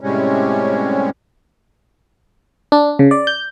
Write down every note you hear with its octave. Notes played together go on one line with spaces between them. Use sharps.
A2 C3 G3 G#3 C#4
D4
C#3
D5
G6